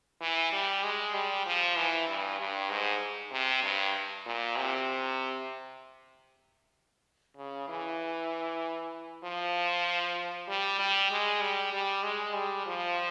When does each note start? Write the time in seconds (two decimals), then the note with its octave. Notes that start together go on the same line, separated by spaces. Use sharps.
0.21 E3
0.53 G3
0.84 G#3
1.14 G3
1.46 F3
1.76 E3
2.08 G2
2.40 G2
2.70 G#2
3.32 C3
3.63 G2
4.26 A#2
4.57 C3
7.37 C#3
7.68 E3
9.24 F3
10.48 G3
10.79 G3
11.11 G#3
11.41 G3
11.73 G3
12.04 G#3
12.35 G3
12.67 F3